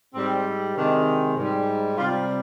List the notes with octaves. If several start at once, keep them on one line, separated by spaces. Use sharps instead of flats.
G#2 G3 C4
C3 D#3 G#3 D4
G#2 G3
C3 G3 F4